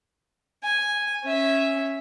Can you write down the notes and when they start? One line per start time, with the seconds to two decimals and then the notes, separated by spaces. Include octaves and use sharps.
0.64 G#5
1.24 C#4 E5